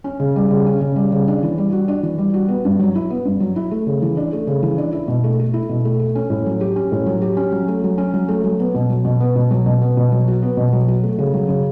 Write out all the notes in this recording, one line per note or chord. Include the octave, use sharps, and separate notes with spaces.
C#4
C#3
G3
C#3
C#4
C#3
G3
C#3
D4
E3
G3
F#4
D4
E3
G3
F#4
B3
G2
F#3
E4
B3
G2
F#3
E4
A3
C#3
E3
D4
A3
C#3
E3
D4
E4
B2
A3
A4
E4
B2
A3
A4
C#4
A2
F#3
G4
C#4
A2
F#3
G4
C#4
F#3
A3
F#3
C#4
F#3
A3
F#3
B3
B2
F#3
B2
B3
B2
F#3
B2
B3
B2
F#3
F#4
B3
B2
F#3
F#4
A3
C#3
F#3
C#3